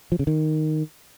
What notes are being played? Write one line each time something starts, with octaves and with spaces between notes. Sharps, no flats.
F3
C#3
D#3